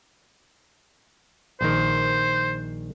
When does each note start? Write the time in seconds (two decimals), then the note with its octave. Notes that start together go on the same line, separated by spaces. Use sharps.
1.61 A#1 D#3 C5